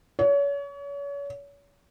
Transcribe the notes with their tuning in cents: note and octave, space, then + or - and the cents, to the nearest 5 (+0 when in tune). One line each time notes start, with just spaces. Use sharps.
C#5 +35